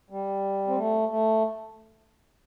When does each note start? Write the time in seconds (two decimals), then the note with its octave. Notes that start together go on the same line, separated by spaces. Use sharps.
0.10 G3
0.68 C4
0.76 A3
1.09 A3